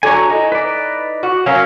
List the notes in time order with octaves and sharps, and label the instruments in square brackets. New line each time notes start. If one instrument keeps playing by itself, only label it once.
[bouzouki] D3 F#3 C#5 [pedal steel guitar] G#5
[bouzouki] D#4 E4
[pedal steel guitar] B4 D5
[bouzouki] F#4
[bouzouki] F#3 A#3 C#4 [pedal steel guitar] F5